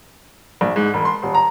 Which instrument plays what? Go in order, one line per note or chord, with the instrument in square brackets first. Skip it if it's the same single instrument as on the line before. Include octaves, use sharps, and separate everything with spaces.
[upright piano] A#1
G#2
E1
C6
D#1
A#5